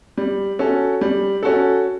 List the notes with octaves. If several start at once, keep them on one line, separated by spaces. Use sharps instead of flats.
G3
C#4 F#4 A4
G3
C#4 F#4 A4